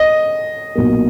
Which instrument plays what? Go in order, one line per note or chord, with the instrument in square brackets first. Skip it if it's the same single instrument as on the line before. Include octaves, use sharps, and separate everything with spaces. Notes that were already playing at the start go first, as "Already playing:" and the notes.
Already playing: [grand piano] D#5
[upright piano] B1 A#2 A#3